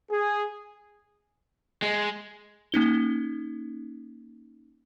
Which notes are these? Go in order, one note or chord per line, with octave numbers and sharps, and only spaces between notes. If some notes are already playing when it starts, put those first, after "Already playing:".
G#4
G#3
A#3 C#4 D#4 G7